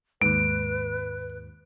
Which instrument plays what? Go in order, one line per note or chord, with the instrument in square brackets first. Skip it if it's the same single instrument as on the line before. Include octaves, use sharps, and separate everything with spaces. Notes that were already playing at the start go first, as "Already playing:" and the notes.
[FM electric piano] D#2 G#2 [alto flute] B4 [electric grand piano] D7